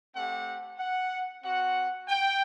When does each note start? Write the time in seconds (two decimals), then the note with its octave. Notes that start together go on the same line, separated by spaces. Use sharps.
0.14 A3 C4 G4 F#5
0.78 F#5
1.43 C4 F#4 F#5
2.08 G5